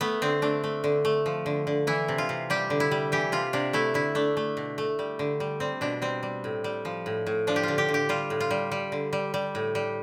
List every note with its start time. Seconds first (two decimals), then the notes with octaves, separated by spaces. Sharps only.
0.01 A3 B3
0.22 D3 C4
0.42 A3 D4
0.64 A3
0.84 D3
1.05 A3
1.26 F3
1.46 D3
1.67 D3
1.87 E3 E4
2.08 C3
2.18 F4
2.29 C3
2.50 G3 G4
2.70 D3
2.80 E4
2.91 G3
3.12 E3 G4
3.32 C3 F4
3.53 C3 D4
3.73 A3 E4
3.94 D3 E4
4.15 A3 D4
4.37 A3
4.57 B2
4.78 A3
4.99 G3
5.19 D3
5.40 G3
5.60 G3 C4
5.81 B2 D4
6.02 G3 C4
6.23 G3
6.44 A2
6.64 G3
6.85 F3
7.06 A2
7.26 A2
7.47 F3 D4
7.56 G4
7.63 D3 F4
7.78 G4
7.88 D3
7.94 G4
8.09 G3 F4
8.30 A2
8.40 F4
8.51 G3
8.72 G3
8.92 D3
9.13 G3
9.34 G3
9.55 A2
9.75 G3